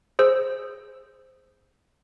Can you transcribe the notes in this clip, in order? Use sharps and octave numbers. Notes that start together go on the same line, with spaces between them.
G#4 C5 E6